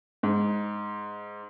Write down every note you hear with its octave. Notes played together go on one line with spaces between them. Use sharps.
G#2